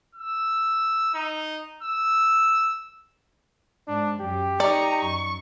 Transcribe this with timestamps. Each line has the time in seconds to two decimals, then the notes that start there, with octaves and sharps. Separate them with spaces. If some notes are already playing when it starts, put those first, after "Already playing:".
0.15 E6
1.14 D#4
1.83 E6
3.88 G#2 D4
4.20 F#2 G4
4.60 D#4 D5 A#5 C#6
5.01 F#2 C#6